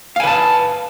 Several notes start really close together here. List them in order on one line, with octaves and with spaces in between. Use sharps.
F5 G#5 B4 A5